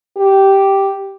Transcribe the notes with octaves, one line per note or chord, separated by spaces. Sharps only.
G4